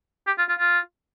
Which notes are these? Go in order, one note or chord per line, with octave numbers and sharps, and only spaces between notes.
G4
F4
F4
F4